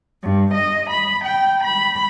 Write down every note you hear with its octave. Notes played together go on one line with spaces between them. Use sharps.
G2
D#5
B5
G5
B5